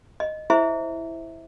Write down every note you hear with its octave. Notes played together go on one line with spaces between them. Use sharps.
D#5
E4 G#4 C5 E5